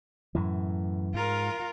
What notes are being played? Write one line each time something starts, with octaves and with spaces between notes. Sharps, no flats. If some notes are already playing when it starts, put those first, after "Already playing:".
F#2 A2 E3
G#2 F4 A#4